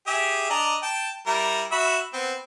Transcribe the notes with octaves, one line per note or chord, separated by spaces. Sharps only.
G4 G#4 E5
D4 D#5 A#5
G5 A5
G3 E4 A#4
F#4 E5 B5
B3 C4